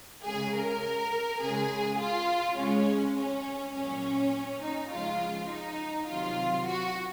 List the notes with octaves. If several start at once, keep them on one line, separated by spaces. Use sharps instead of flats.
C#3 G#3 G#4
A#4
C#3 G#3 G#4
F4
C#3 G#3 C#4
C#4
A#2 F#3 C#4
D#4
C#3 F3 G#3 F4
D#4
C3 D#3 F#3 F4
F#4